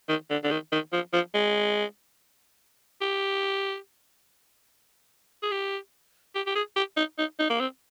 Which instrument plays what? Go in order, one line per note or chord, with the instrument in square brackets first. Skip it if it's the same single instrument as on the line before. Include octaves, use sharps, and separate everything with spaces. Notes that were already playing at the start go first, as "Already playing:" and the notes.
[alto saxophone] D#3
D3
D3
D#3
D#3
F3
F3
G#3
G4
G#4
G4
G4
G4
G#4
G4
D#4
D#4
D#4
A#3
C4